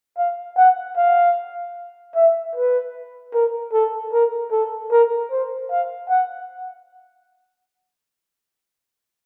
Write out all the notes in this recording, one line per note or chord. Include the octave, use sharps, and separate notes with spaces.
F5
F#5
F5
E5
B4
A#4
A4
A#4
A4
A#4
C5
F5
F#5